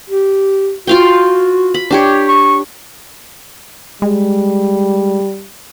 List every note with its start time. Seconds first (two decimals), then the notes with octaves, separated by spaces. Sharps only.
0.10 G4
0.87 F4 F#4 F5 G5
1.74 B5
1.91 D4 G4 C#5
2.29 C#6
4.02 G3 G#3